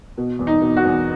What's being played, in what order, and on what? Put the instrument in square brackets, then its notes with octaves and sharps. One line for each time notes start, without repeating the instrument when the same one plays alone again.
[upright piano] B2
E2
D#4
B2
F#4
E2